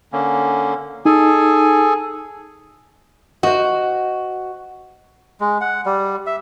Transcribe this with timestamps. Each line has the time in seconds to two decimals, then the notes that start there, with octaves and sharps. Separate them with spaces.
0.13 D3 A#3 C#4
1.05 D#4 G#4 A4 G#5
3.43 F#4 C5 D#5
5.40 G#3
5.61 F#5
5.86 G3
6.26 E5